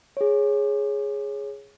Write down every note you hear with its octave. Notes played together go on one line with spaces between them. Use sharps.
G#4 C#5